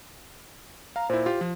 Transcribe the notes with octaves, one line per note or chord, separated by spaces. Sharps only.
F5 A#5
A#2 E4 C5
F4 G4
F3